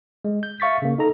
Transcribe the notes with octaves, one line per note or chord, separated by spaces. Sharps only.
G#3
G6
E5 F5 C#6 A6 B6
C#3 A#3
D#4 A4 A#5